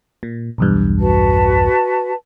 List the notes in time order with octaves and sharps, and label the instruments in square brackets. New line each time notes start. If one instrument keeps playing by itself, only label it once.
[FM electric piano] A#2
B1 E2 G2
[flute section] F#4 B4 A5